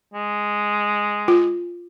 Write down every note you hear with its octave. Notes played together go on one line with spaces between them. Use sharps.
G#3
F4